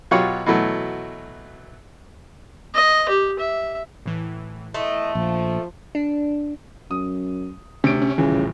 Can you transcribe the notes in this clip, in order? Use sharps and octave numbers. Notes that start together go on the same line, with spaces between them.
B2 F#3 F4 G4 C#5 F#5
B2 E3 F#3 A3
D#5
G4
E5
A2 E3
E2 A3 E4 D#5 C6
A#1 F3
D4
F#2 D#6
D2 C3 C#4 D7
C#4
D#1 A1 C#3 E3